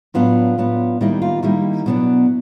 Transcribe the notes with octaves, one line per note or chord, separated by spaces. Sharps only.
A2 F#3 B3 D4 F4
A2 F#3 B3 D4
D#3 G3 A#3 D#4 E4
F4
D#3 G3 A#3 D#4 E4
B2 F#3 B3 D4